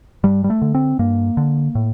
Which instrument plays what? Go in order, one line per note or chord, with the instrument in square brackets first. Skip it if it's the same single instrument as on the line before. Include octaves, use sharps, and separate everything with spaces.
[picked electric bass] G2 G3
G3
A3
D3
C4
G2 A#3
D3
A2